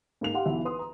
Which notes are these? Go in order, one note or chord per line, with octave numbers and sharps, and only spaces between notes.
G#2 A#3 F7
G4 F5 F#5 C6
B1 E3 E5
B4 C6 D#6
A#5